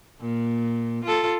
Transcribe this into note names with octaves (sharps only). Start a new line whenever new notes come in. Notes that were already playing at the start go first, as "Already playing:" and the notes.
A#2
F4 A4